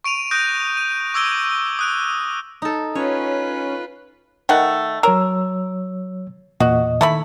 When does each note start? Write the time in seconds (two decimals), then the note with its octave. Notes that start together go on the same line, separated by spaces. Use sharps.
0.04 C#6 D7 D#7 F7
0.31 C#6 D#6 F#6 G6 A#6 D7
0.77 D#7
1.14 C#6 D6 E6 G#6 D7 G7
1.79 D#6 F#6 D7
2.62 D#4 A4
2.95 C#4 F4 B4 C#5
4.49 D#3 A3 F#5
5.03 F#3 A#4 C#5 E6
6.60 E2 A#2 F#4 D#5
7.01 D#3 A3 E4 B5